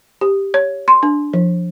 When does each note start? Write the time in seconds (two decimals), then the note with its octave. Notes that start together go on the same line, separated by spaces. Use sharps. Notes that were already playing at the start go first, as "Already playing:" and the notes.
0.21 G4
0.54 C#5
0.88 C6
1.03 D4
1.33 F3